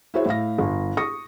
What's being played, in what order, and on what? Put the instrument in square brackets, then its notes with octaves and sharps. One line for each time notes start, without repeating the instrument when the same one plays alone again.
[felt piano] E4 F#4 G#4 C5 C#5 E5
A2 E5 F5 A#6
G1
C#6 D#6 A#6 C#7